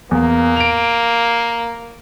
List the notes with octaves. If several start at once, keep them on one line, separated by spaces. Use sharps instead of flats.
E2 A#3
D7 F7